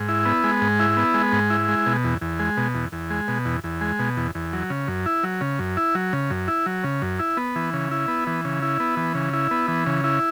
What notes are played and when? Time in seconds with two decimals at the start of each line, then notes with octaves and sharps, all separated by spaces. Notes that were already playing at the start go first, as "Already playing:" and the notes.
Already playing: G#2
0.09 E4
0.25 B3
0.44 G#3
0.61 G#2
0.80 E4
0.97 B3
1.14 G#3
1.32 G#2
1.50 E4
1.68 G#3
1.86 B2
2.04 E2
2.21 E2
2.39 G#3
2.57 B2
2.74 E2
2.92 E2
3.10 G#3
3.28 B2
3.45 E2
3.64 E2
3.81 G#3
3.99 B2
4.17 E2
4.35 E2
4.53 F#3
4.70 C#3
4.88 F#2
5.06 E4
5.23 F#3
5.41 C#3
5.59 F#2
5.77 E4
5.95 F#3
6.13 C#3
6.30 F#2
6.48 E4
6.66 F#3
6.84 C#3
7.02 F#2
7.19 E4
7.37 B3
7.56 E3
7.73 C#3
7.91 E4
8.08 B3
8.27 E3
8.45 C#3
8.62 E4
8.80 B3
8.97 E3
9.15 C#3
9.33 E4
9.51 B3
9.68 E3
9.86 C#3
10.04 E4